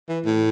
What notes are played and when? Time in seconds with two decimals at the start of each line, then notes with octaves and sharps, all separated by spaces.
0.08 E3
0.25 A2